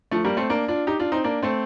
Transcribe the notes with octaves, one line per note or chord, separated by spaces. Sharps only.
F3 A3
G3 A#3
A3 C4
A#3 D4
D4 F4
D#4 G4
D4 F4
C4 D#4
A#3 D4
A3 C4